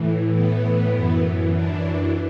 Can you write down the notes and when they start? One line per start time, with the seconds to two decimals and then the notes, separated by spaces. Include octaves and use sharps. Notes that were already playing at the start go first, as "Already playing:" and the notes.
Already playing: A2 E3
0.34 B3
0.94 F#2 E3
1.54 D4